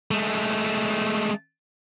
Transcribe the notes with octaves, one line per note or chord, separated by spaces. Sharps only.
G#3 A3